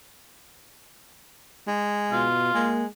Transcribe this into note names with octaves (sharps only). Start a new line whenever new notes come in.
G#3
B2 F4
G#3 A#3